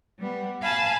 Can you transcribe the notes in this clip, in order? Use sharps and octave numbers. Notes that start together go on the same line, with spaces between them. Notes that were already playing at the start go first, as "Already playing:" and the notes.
G3 B3
F5 G#5 A5 B5